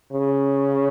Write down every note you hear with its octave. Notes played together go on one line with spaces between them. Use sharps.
C#3